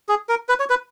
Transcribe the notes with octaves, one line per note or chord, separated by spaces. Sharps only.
G#4
A#4
B4
C#5
B4